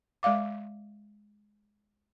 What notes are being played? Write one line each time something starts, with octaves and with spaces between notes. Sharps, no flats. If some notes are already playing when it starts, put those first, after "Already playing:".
G#3 D5 F5 D6